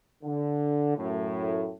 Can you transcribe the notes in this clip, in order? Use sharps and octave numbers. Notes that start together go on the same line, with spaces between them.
D3
F#2 A2